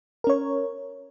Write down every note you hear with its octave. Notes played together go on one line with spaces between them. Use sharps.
C#4 A#4 C#5